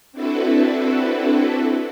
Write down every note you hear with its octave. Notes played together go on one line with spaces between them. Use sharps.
C4 D4 E4 F#4 A4 B4